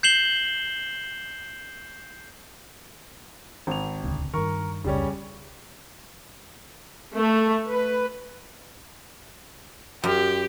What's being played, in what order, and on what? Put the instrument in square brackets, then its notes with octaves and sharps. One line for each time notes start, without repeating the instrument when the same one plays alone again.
[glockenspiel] G6 C7 E7 F#7 G7
[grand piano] G#1 F7
[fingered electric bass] D#1 C#2 D3
[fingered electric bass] G2 D#3 [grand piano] A#4 C#6
[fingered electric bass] F1 C#2 [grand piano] C#3 G3 C#4
[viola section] A3
B4
[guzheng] F#2 [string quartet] G4